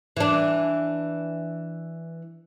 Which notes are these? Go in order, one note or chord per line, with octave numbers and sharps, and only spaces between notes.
E3 D4